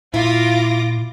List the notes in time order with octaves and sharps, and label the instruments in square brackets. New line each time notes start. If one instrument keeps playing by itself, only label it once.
[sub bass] A#2 [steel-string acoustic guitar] E4 [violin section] F4 D6 A#6